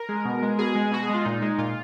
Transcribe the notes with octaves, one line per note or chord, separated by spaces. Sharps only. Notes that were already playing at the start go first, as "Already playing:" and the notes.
Already playing: A#4
G#3
B2
G#3
B2 G#4
G#3
B2 F#4
G#4
G#3 F4
A#2 D#4
G#3
A#2 F4